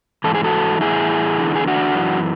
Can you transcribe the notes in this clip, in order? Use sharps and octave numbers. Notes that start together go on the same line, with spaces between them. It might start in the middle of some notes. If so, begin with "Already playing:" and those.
G#2 E3 A4
G#4
F#4 A4
A2 E3 E4 G#4
E2 D3
G#4
D4 F#4
F#2 E3